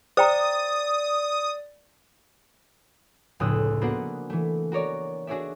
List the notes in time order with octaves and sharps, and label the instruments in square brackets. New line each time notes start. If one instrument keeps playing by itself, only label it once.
[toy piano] C5 G5 A#5 [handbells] D5 [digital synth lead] D#6
[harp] F1 C#2 A2 D#6 E6 F#6
A#3 B3 D4 F#4 C5 F#5
E3 A3
F#4 A#4 C#5 D5
D4 F#4 G#4 C#5 D5 E5